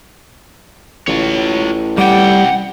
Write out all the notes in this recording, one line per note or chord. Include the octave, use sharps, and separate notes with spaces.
A1 F4 C#5
C2 G3 F#5 G5